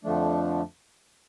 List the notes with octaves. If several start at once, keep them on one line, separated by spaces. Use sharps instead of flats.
F2 D3 F3 A3 D4